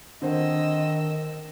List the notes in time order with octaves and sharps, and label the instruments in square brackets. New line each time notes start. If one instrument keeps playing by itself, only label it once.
[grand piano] D3 C4 C5 [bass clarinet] D#3 [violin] D#5 E6